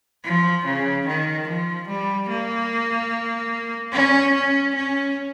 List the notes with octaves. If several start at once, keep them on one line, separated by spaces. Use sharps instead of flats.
F3
C#3
D#3
F3
G3
A#3
C#4
C#4
C#4